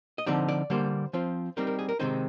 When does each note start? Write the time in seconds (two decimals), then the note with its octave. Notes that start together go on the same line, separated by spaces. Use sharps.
0.18 D#5
0.26 D3 F3 C4 D#4 D5
0.48 D5
0.70 D3 G3 A#3 C5
1.13 F3 C4 F4
1.57 G3 C4 D#4 A#4
1.67 A#4
1.79 G#4
1.89 A#4
1.99 C3 D#3 G#3 C4 D#4 C5